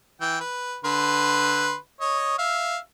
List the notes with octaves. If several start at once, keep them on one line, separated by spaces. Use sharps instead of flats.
E3 G5
B4
D3 B4 C6
C#5 D#5
E5 F5